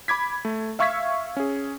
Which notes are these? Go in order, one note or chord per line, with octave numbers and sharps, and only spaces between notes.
B5 D6 G#6 B6
A3
E5 F5 C#6 E6 G#6 B6
C#4 G#4